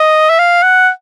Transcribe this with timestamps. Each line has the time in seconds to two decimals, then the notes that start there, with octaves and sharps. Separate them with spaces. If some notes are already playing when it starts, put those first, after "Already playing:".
Already playing: D#5
0.30 E5
0.38 F5
0.63 F#5